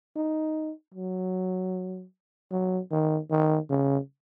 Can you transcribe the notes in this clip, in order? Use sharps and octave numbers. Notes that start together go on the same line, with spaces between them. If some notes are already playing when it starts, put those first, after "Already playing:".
D#4
F#3
F#3
D#3
D#3
C#3